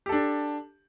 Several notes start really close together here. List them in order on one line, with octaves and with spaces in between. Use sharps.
G4 A4 D4